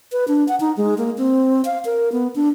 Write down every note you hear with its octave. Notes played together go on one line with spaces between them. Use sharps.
B4
D4
F#5
D#4
G#3
A#3
C4
F5
A#4
B3
D4